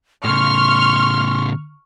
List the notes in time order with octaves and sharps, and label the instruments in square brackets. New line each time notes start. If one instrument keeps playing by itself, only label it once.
[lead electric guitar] A2 C#3 [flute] C6 [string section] C#6 F6